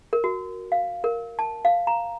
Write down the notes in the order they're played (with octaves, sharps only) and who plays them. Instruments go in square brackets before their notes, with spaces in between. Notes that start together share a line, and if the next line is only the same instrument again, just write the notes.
[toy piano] A#4
F#4
F5
A#4
A5
F5
A#5